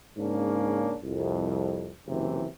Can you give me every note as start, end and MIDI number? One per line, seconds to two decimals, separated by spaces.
0.17 0.95 44
0.17 0.95 49
0.17 0.95 58
0.17 0.95 61
0.17 0.95 62
1.02 1.92 36
1.02 1.92 41
2.07 2.47 30
2.07 2.47 48
2.07 2.47 51
2.07 2.47 52